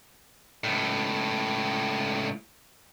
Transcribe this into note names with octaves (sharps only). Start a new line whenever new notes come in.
C#2 A2